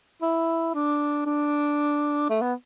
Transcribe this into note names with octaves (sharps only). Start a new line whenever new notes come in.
E4
D4
D4
A3
B3